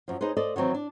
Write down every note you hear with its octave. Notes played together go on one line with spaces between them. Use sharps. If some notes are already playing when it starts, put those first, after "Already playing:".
F#2 F3
D#4 G#4 B4 C5
A4 C5 D5 D#5
D#3 E3 F#3 C4
D4